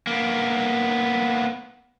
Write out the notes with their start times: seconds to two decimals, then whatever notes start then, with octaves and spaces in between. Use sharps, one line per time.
0.07 A#3 B3